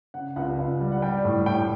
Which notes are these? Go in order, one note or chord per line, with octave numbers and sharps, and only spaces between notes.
C#3 F#5
C#2 F#5
C#2
G3
F#5
G3 G5
A2
A2 G5